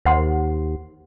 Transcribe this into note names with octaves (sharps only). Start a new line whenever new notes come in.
D#2 C5 F#5 C6